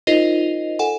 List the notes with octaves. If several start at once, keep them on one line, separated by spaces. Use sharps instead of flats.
D#4 F4 A#4 C5 D#5
A4 F#5 G#5